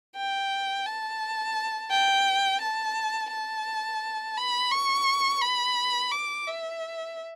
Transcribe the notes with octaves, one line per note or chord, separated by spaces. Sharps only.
G5
A5
G5
A5
A5
B5
C#6
B5
D6
E5